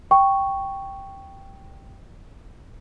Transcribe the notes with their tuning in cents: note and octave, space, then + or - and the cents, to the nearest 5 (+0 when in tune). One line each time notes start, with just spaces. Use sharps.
G5 +0 C#6 +0